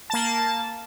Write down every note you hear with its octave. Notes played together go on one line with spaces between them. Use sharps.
A#3 A5